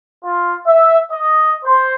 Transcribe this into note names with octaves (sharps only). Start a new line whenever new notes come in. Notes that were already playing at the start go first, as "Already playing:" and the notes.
F4
E5
D#5
C5